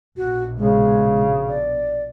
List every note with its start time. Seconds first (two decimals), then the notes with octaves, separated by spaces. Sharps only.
0.17 A#1 B2 F#4
0.57 C#3 G#3
1.48 D5